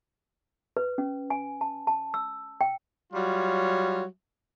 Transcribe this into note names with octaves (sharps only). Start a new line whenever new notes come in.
B4
C#4
G#5
A5
A5
E6
G5
F#3 G3 F4 C#5